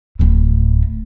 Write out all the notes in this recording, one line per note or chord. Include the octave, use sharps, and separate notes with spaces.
D1 A2